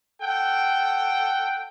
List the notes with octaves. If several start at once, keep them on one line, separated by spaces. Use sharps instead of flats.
A4 F#5 G5